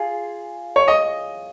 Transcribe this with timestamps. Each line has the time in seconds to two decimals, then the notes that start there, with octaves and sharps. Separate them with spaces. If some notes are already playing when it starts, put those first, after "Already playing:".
Already playing: F4 G#4
0.76 C#5
0.88 D#5